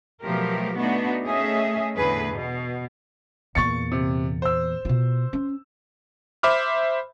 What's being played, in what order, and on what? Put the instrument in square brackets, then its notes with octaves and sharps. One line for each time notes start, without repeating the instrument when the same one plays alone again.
[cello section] B2 F3 F#3 A3 G4 A#4
A3 B3 D4 D#4 F#4
A3 C#4 G#4 D#5 E5
E2 A2 D3 G#4 B4
B2
[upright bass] E2 A#2 [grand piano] C#6 A6 C#7
[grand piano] C3
C5 E6
[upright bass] B2 F4
C#4
[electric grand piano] C5 E5 B5 D6 F6